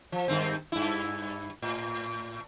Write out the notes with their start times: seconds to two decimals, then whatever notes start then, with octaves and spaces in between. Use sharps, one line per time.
0.12 F3
0.28 G2 D#3 C4
0.72 G2 E4
1.62 A2